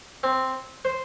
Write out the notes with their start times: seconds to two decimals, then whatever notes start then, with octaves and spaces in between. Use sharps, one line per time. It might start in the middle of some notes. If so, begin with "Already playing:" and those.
0.23 C4
0.85 C5